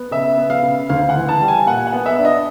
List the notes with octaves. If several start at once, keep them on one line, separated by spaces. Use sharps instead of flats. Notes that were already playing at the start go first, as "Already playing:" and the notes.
Already playing: B3
C#3 E5
B3
F5
C#3
D2 F5
F#5
E3
A5
G3
G#5
A#2 F#5
F#5
B3
E5
D4
D#5